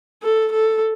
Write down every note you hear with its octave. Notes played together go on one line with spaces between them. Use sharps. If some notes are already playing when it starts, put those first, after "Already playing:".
A4
A4